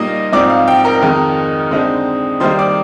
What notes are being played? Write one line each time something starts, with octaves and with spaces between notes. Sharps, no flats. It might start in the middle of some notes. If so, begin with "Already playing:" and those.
Already playing: A#2 G3 A#3 D#4 D#5 D#6
G#2 F3 C4 D#4 D5 D6
F5
G5
A#4 A#5
F2 D#3 G#3 D#4
D3 G#3 C4 D#4
D#3 G3 A#3 D#4 C5 C6
D5 D6